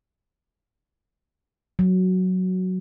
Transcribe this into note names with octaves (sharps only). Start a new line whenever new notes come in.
F#3